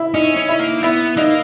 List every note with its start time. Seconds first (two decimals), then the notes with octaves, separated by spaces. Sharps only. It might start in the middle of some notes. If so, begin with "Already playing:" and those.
Already playing: E4
0.14 C#4 D#4
0.37 C#4
0.49 E4
0.60 A#3
0.82 B3 E4
1.17 A#3 D#4